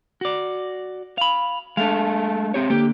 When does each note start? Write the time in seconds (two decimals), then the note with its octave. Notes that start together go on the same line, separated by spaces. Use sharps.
0.21 F#4 D5
1.18 F5 B5
1.77 G#3 A3 D4 A4 F5
2.54 C4 G4 C#5
2.70 D3 A#3 G4